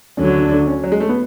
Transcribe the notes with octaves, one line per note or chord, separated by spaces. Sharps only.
D2 D3 F#3 C#4
D4
C#4
F#3
G#3
A3
B3